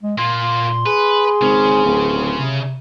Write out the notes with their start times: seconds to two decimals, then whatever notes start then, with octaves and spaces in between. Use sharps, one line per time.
0.03 G#3
0.18 A#2 A#3 F4 C6
0.86 G#4 B4
1.41 G#1 C#3 C#4
1.85 D1
2.36 C3